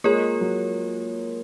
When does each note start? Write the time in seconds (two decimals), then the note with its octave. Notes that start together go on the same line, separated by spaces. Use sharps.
0.04 G#3 A#3 F4 A#4 C#5
0.41 F#3